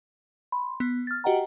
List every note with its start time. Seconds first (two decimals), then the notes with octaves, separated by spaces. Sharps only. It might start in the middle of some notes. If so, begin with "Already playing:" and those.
0.52 B5 C6
0.80 B3
1.07 F6 A6
1.24 F#4 G4 D#5 F#5 G5 A#5